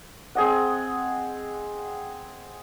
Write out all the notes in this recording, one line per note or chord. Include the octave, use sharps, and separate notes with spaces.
C4 G#4 D#5 F#5